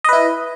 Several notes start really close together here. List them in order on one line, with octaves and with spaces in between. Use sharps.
D#5 B4 E4